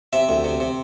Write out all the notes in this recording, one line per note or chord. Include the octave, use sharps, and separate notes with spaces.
C3 E5
D2
C3
C3